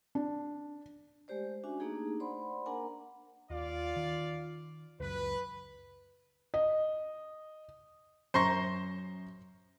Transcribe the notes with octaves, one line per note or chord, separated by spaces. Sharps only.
D4
G#3 A3 G4 C5 D5
C#4 D4 F#4 E5 G#5
A3 A#3 D4 D#4 G4 G#4
C5 D5 F#5 B5 C6
A#3 D4 A#4 F#5 G#5 A#5
D#2 F4 D5 F5
D#3
C#2 F#2 B4
D#5
F#2 C5 A#5 C6 C#6 A#6